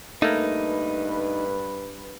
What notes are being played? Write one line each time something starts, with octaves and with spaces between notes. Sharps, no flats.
G2 A3 A#3 D#4 B4